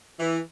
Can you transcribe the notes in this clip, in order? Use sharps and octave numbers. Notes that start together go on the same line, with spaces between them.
E3